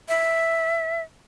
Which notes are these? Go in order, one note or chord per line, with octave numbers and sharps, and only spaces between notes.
E5